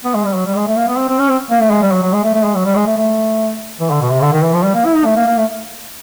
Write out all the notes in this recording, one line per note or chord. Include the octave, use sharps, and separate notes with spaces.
B3
G#3
G3
F#3
G3
G#3
A3
A#3
B3
C4
C4
C#4
C4
A#3
A3
G#3
G3
F#3
F#3
G#3
A3
A3
G#3
F#3
G3
G#3
A3
A3
E3
D3
B2
C3
D3
D#3
E3
F3
G3
A#3
E4
D#4
A3
A#3
A#3
A3